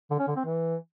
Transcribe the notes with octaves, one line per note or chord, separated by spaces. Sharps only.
D3
C#4
D3
C4
E3